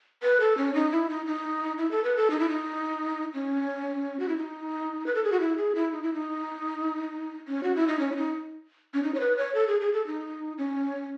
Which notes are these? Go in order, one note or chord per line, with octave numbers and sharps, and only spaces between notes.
B4
A4
C#4
D#4
E4
D#4
D#4
E4
A4
B4
A4
D#4
E4
D#4
C#4
F#4
E4
D#4
B4
A4
G#4
F#4
E4
G#4
E4
D#4
E4
D#4
C#4
F#4
E4
D#4
C#4
E4
D#4
C#4
D#4
C#5
B4
C#5
A4
G#4
G#4
A4
D#4
C#4